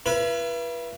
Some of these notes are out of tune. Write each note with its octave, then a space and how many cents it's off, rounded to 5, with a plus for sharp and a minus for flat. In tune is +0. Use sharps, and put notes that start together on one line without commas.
E4 +40 B4 -25